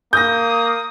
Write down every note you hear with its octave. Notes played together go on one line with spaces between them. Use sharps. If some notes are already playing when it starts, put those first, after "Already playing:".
A#3 D#6 G6 A#6